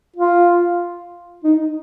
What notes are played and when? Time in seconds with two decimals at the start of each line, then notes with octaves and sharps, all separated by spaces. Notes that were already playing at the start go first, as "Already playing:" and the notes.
0.16 F4
1.44 D#4